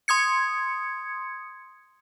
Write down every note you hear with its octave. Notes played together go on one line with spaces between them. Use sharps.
C6 D#6 G#6 C#7